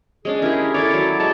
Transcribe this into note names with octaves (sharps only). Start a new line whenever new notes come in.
G#3 C#4 D4 G#4
E4 G4 G#4 A#4
E4 A4 C#5 D5
F#3
G#3 C#5 A5 C#6